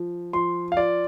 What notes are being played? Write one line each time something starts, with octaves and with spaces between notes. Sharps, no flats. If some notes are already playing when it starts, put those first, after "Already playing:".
Already playing: F3
F3 C6
F5
F4 D5